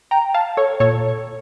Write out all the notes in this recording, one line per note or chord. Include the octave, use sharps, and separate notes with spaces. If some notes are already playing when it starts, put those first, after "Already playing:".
G5 A#5
F5 A5
A4 C#5
A#2 A4 C#5